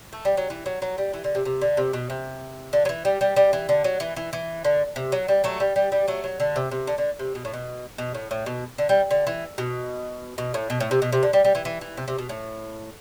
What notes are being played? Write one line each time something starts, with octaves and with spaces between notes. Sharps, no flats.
A3
G3
F#3
E3
F#3
F#3
G3
E3
D3
C3
C3
D3
C3
B2
C3
D3
F#3
E3
G3
G3
G3
E3
D3
F#3
E3
E3
E3
D3
C3
F#3
G3
F#3 A3
G3
G3
G3
F#3 A3
F#3
D3
C3
C3
D3
D3
C3
B2
A2
B2
B2
A2
A2
B2
D3
G3
D3
E3
B2
B2
A2
B2
A2
C3
B2
C3
D3
G3
G3
E3
E3
E3
C3
C3
B2
A2